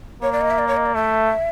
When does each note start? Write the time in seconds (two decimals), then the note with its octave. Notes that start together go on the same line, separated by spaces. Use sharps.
0.22 A#3 C#5
0.32 D5
0.41 D#5
0.50 E5
0.58 D5
0.68 C#5
0.77 D#5
0.86 D5
0.95 A3 E5